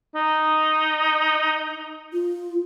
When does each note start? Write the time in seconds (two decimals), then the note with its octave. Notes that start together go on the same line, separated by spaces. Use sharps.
0.15 D#4
2.13 F4